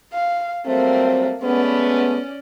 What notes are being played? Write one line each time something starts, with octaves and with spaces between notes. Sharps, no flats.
F5
F#3 G3 A3 A#3 C4
G#3 A3 B3 C#4 D5